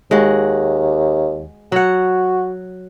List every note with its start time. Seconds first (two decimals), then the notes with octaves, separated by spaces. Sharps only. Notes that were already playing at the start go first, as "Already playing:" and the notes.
0.11 D#2 G#3 F#4
1.72 F#3 F#4 F#5